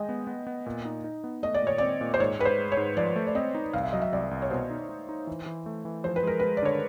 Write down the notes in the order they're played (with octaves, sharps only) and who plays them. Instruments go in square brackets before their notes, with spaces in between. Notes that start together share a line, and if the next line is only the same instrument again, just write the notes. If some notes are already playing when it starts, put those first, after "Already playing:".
Already playing: [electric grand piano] G#3 [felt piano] D#5 G5 G#5
[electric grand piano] B3
B3
B3
A#2
D#4
D#4
B3
[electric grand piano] A3 [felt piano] D#5
[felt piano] D5
[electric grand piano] A#2 [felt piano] C#5
[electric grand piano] C4 [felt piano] D5
[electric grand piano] A#2
[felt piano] C5
[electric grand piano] G#2 [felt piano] C#5
[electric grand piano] G#2 [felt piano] B4
[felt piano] C5
[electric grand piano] G#3
[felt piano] C#5
[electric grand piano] G#2
[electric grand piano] F3 [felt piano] D5
[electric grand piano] A3
[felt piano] D5
[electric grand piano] C4 [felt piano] D#5
[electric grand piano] D#4
[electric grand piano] C2 [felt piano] F5
[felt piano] E5
[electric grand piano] F#3 [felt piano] D#5
[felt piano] E5
[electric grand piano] C2 [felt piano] D5
[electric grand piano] C2
[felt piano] C#5
[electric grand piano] B2 [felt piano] C5
[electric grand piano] D#4
D#4
D#4
E3
E3
A3
E3
[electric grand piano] F3 [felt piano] C5
[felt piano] B4
[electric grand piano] G#3 [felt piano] A#4
[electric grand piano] G#3 [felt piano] B4
[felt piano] D5
[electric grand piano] D3 [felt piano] C#5